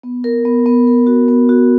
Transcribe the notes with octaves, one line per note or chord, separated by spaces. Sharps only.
B3
A#4
B3
B3
A#4
F#4
B3
F#4